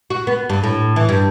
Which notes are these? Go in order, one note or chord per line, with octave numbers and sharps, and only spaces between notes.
F#4
B3
G2
A2
E3
G2